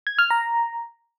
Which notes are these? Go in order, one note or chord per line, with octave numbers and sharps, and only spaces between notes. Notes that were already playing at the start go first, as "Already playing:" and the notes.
G#6
F6
A#5